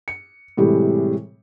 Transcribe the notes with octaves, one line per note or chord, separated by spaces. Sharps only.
C#7
A2 C3 E3 G3 G#3 G4